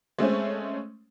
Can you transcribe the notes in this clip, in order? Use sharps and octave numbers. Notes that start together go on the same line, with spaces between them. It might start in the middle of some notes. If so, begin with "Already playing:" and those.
G#3 A3 C4 C#4